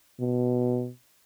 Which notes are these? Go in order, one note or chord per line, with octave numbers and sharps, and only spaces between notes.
B2